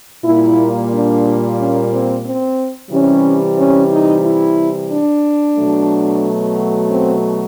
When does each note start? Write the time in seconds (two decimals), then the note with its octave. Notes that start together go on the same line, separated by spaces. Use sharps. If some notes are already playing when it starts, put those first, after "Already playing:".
0.24 A#2 G3 A#3 E4
0.91 D4
1.58 C#4
1.91 C4
2.24 C4
2.90 C3 E3 G3 C#4
3.57 C#4
3.90 D#4
4.23 E4
4.90 D4
5.57 B2 F#3 A3
6.90 C4